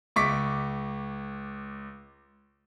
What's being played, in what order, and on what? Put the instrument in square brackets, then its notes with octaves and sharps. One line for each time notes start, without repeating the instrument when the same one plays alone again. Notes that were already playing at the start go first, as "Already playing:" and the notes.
[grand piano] C#2 C#6 D6 B6